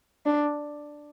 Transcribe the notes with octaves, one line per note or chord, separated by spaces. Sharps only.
D4